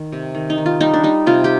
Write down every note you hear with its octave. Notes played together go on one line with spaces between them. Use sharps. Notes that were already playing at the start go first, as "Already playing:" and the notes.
Already playing: D#3
C3
D#3
D#4
D#3
F4
G3 D#4
D4
G3 D#4
C3 F4
G4